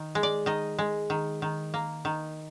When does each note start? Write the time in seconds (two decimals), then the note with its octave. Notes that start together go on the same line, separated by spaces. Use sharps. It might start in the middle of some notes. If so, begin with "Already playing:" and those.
Already playing: D#3
0.15 G#3
0.23 D5
0.46 D#3 D#5
0.79 G#3
1.10 D#3
1.42 D#3
1.74 A#3
2.05 D#3